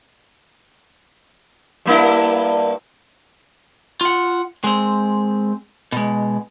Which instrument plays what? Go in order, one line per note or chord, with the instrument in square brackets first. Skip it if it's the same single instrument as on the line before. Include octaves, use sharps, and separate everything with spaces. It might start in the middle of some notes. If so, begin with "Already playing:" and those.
[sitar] G2 A#3 E4
[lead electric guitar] F4 F#5
G#3 C4
B2 G#3